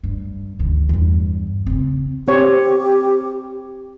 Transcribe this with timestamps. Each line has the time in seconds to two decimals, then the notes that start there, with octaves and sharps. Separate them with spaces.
0.03 G2
0.59 D2 D#3
0.89 E2 G2
1.66 C#3 C4
2.28 C4 G4 C#5